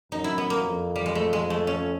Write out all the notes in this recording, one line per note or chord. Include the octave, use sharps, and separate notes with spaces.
F#2 D#4
E4
B3
A#3
F2
G3
G#3
A3
G#3
A3
C#4